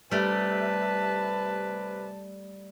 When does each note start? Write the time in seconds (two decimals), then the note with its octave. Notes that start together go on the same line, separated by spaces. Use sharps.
0.11 C3 G3 A3 B4 A5